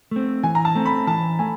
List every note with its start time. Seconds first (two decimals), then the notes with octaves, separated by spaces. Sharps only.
0.11 A3 C4
0.43 E3 G#5
0.55 A#5
0.65 A5
0.75 A3 C4
0.85 B5
1.07 E3 A5
1.39 A3 G#5